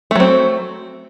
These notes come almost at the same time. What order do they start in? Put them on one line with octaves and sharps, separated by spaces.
A3 F#3 C4